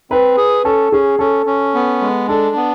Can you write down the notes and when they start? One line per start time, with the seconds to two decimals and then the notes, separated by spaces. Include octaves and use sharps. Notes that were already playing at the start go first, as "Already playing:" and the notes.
0.11 C4 B4
0.37 G#4
0.64 C#4 A4
0.92 C#4 G#4
1.19 C#4 A4
1.46 C#4
1.74 B3
2.01 G#3
2.28 D4 A4
2.56 B3